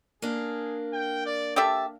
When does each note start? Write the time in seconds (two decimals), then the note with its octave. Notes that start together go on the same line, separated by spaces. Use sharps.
0.22 A#3 D4 G#4
0.93 G5
1.26 D5
1.56 G4 A4 E5 A5